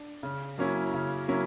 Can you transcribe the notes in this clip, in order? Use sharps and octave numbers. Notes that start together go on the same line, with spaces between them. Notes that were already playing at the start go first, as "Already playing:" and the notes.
Already playing: D4
C#3
F#3 A#3 C#4 E4
C#3
F#3 A#3 C#4 E4